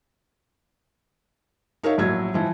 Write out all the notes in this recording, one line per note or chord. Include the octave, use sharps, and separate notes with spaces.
D#4 A#4 C#5 E5 F5
A#1 A2 F#3 E5 G#6
E3 F3